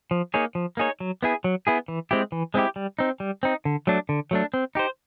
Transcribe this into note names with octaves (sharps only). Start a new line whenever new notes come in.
F3
A#3 D#4 G#4 C#5
F3
A#3 D#4 G#4 C#5
F#3
B3 E4 G#4
F#3
B3 E4 G#4
E3
G#3 C4 E4 G4
E3
G#3 C4 E4 G4
G3
C4 D#4
G3
C4 D#4
D3
F#3 A3 D4
D3
F#3 A3 D4
C4
D#4 G4 C5